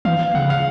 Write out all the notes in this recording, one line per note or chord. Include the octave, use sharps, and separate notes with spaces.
E3 F5
C#3 F#5
F5